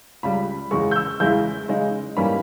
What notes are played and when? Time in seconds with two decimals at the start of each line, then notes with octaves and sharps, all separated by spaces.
0.23 C#2 C#3 G3 B5
0.71 E2 C#3 G#3 C#6
0.91 G6
0.96 E6
1.20 E2 C#3 G#3 C#4 E4 G6
1.68 C#3 G#3 D#4
2.17 G#2 E3 G3 A#3 C#4 B5